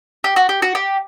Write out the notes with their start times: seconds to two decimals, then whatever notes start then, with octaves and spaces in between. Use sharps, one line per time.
0.24 G4
0.36 F#4
0.49 G4
0.62 F#4
0.75 G4